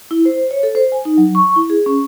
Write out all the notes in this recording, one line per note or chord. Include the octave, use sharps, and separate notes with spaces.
E4
C5
C#5
A4
C5
G#5
D#4
F#3
C#6
E4
G#4
C#4